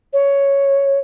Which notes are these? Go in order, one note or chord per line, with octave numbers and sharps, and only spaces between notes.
C#5